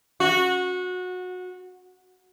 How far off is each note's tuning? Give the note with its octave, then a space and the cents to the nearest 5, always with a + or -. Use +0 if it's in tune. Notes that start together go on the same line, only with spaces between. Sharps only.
F#4 -20